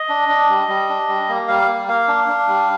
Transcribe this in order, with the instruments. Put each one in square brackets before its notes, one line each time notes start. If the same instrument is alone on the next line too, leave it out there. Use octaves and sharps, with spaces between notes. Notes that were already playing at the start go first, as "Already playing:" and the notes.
Already playing: [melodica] D#5
D4
D4
G3
G3
D4
G3
A#3
G3 F5
A#3
A#3 F5
D4
D4
G3